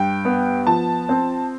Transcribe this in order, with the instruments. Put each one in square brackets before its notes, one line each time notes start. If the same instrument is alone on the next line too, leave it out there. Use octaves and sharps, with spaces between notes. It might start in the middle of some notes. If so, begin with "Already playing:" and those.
Already playing: [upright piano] G2 G5
B3
F3 A5
C4